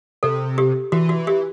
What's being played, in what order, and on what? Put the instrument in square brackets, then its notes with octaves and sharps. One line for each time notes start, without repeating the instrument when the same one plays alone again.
[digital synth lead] C3 [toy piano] A4
[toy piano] G4
[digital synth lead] E3 [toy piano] F#4
[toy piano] F#4
G4